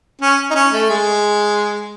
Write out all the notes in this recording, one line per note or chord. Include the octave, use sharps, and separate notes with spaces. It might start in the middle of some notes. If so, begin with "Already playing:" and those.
C#4
D#4
C#4
A3
G#3